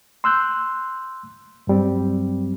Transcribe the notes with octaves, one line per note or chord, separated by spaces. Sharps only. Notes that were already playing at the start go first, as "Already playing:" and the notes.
C6 E6 F#6 G6
G2 F#3 G3 C4